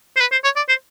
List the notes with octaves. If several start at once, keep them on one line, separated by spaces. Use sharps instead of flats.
C5
B4
C5
C#5
D5
C5